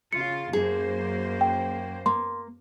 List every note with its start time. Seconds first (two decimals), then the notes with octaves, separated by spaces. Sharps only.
0.13 C#3 F4 C#7
0.53 F#2 A#3 G#4 C5
1.41 G5
2.06 A#3 C6